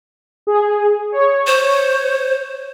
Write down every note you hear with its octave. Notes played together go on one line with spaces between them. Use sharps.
G#4
C#5
C5